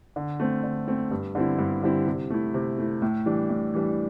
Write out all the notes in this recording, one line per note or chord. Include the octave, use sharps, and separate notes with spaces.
D3
A3 C4
D3
A3 C4
G2
D3 G3 C4 E4
G2
D3 G3 C4 E4
C3
A3 E4
C3
A3 E4
A2
E3 G3 D4
A2
E3 G3 D4